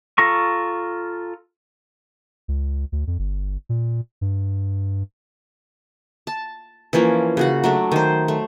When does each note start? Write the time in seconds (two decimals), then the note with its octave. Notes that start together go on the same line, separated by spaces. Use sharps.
0.18 F4 A4 A#5 C#6
2.48 C#2
2.92 D2
3.07 F2
3.19 G1
3.69 A#2
4.21 G2
6.27 A5
6.93 E3 F3 A#3 C#4
7.37 C#3 F#4 F#5
7.64 F#3 A3 D4
7.92 D#3 C5
8.28 A3